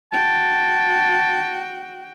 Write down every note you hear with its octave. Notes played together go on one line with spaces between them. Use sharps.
F#4 G5 A5